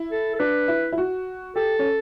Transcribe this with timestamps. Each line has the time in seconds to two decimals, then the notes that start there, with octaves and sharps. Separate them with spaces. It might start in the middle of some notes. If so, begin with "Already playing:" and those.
Already playing: E4
0.11 A4
0.35 A4
0.39 D4 B4
0.68 E4
0.93 E4
0.98 F#4
1.56 G4 A4
1.79 C#4